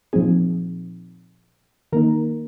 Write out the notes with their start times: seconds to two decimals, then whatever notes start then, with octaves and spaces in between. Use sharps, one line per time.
0.13 A#2 F3 C4 D#4 G#4
1.92 D#3 A#3 D#4 A#4